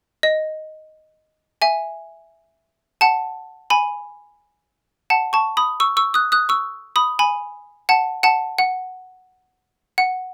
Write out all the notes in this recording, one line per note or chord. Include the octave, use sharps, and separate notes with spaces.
D#5
E5 G#5
F#5 A5
G#5 B5
F#5 A5
A5 C#6
B5 D#6
C#6 E6
C#6 E6
D#6 F#6
D#6 F#6
C#6 E6
B5 D#6
G#5 B5
F#5 A5
F#5 A5
F#5
F#5